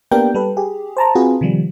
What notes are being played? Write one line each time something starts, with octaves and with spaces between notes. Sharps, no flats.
A#3 B3 D4 G4 A#4 G5
G3 A4 B4
G4 G#4
C5 A5 A#5
C4 F4 F#4 G#4 B4
C3 D#3 F3 G3